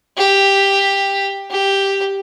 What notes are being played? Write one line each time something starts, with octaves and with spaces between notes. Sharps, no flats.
G4
G4